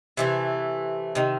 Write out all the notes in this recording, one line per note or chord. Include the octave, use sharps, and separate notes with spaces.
C3 E3 A3
C3 D#3